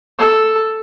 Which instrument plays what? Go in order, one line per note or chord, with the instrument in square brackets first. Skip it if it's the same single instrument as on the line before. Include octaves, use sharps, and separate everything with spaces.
[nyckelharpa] A4